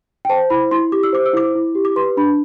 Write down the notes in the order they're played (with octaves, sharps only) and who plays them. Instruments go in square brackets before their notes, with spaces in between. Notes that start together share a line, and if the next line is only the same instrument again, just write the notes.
[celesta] G5
C5 A5
E4 B5
E4 C6
G4 D6
E6
C5 D6
E6
E4 D6
E4
G4
D6
B4 C6
D4 B5